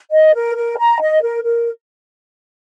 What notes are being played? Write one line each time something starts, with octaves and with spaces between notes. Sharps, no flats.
D#5
A#4
A#4
A#5
D#5
A#4
A#4